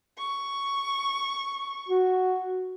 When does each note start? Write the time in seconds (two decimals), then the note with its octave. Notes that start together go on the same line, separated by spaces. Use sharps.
0.18 C#6
1.89 F#4